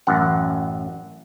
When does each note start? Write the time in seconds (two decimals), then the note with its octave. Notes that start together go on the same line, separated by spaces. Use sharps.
0.07 A1 F#2 F#5